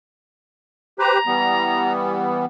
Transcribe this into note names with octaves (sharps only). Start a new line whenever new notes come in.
G4 B4 C5 A#5
E3 G3 B3